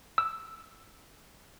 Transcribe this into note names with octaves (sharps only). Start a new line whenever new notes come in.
E6